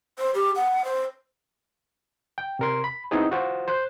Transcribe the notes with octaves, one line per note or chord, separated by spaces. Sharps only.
C5
G4
F#5
C5
G5
C3 A#4 C6
B5
B3 C4 D#4 E4 F#4 G#4
F4 F#4 C5
C5 F#6 G6